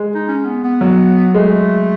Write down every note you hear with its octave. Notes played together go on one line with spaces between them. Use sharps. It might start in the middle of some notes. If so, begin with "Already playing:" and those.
Already playing: G#3
D#4
C#4
B3
B3
F#3
G#3 A3